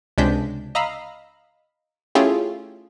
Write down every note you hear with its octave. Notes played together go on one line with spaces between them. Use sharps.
C#2 C3 G#3 D4 G6 B6
D#5 F5 A#5 B5 E6 C7
A3 C#4 E4 F4 G4 G#4